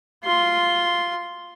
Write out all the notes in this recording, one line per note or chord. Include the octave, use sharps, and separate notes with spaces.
F4 C6